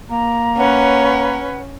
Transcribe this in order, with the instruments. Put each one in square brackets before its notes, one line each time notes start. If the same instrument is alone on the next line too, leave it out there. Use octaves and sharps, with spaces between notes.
[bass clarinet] A#3 [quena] A#5
[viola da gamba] C#4 [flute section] B4 C#5 F#5